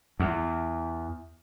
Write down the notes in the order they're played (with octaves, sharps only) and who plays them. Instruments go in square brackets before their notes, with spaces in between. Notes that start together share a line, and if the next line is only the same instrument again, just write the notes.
[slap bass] E2